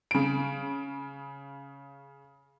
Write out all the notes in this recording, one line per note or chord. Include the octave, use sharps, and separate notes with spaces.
C#3 D7